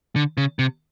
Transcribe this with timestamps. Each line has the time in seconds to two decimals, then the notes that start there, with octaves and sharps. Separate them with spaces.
0.16 D3
0.37 C#3
0.59 C3